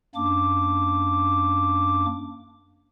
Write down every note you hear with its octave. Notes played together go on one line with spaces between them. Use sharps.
F#2 A#3 D4 D6